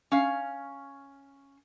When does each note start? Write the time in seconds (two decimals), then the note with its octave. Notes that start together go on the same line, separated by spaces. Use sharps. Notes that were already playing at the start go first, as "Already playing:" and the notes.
0.12 C#4 F5